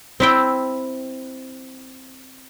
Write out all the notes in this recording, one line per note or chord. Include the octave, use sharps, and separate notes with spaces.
C4 E4 G5